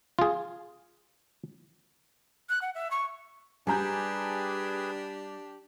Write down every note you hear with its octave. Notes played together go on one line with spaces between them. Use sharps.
F4 G#4
F#6
F#5
E5
C#6
G3 D4 G4 G#4 B4 G#5 A#5 G6